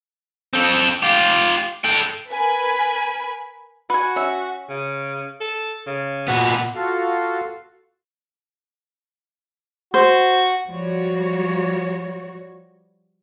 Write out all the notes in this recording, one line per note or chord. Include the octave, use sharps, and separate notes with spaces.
C4 A4
F4 G4
A4 G5
A#4 B4 G#5 B5
F#4 B4 G#5
C#4 E5
C#3
A4
C#3
A#2 B3 F#4
F4 F#4 A4 F5
F#4 C5
F3 G3 F#4 C#5